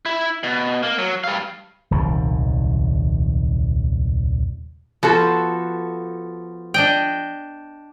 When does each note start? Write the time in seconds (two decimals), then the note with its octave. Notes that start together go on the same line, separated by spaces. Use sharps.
0.06 E4
0.43 B2
0.83 A#3
0.99 F#3
1.24 G3 F5
1.91 D#1 C2 F#2 D#3
5.03 F3 B3 F#4 A4
6.74 D4 D#5 G5